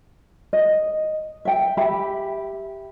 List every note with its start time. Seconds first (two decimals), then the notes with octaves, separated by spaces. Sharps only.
0.53 D#5
1.45 E5 G5
1.77 G4 E5 B5